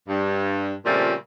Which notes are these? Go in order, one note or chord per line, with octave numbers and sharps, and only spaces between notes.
G2
A#2 C#3 F3 G3 A3 C4